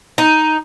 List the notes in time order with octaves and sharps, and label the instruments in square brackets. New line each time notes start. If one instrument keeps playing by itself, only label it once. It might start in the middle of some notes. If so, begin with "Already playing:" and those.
[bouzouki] D#4